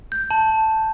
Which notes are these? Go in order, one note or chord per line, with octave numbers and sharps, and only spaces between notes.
G6
A5